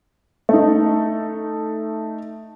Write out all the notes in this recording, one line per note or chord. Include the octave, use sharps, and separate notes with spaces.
A3 D#4